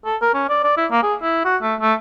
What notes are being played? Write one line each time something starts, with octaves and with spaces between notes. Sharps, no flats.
A4
A#4
C#4
D5
D5
E4
A#3
G#4
E4
F#4
A3
A3